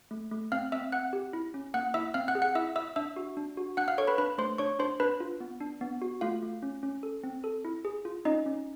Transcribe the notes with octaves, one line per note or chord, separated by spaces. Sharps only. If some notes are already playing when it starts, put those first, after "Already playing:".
A3
A3
C4 F5 F6
C4 E5 E6
C4 F#5 F#6
G4
E4
C#4
A#3 F#5 F#6
E4 E5 E6
C4 F5 F6
F#5 F#6
G#4
F#5 F#6
E4 E5 E6
E4 E5 E6
D4 E5 E6
F#4
D4
F#4
D4 F#5 F#6
F5 F6
A4 C#5 C#6
B4 B5
D4 B4 B5
A3 C5 C6
D4 C#5 C#6
D4 C5 C6
D4 B4 B5
F4
B3
D4
B3
F#4
A3 F4 F5
A3
C#4
C#4
A4
C4
A4
E4
G#4
F4
C#4 D#4 D#5
C#4